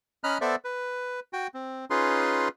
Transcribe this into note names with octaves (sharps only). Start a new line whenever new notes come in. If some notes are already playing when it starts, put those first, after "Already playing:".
C#4 D#5 A#5 B5 F6 F#6
B3 A4 C5 D5 E5
B4
F#4 G5
C4
C#4 D#4 F4 G#4 B4 C6